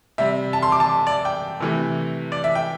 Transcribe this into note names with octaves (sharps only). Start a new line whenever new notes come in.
C3 G3 E5
A5
C6
D6
A5
D5
G5
C3 E3 A3
D5
E5
G5